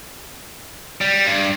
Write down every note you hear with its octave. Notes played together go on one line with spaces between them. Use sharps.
G3
G2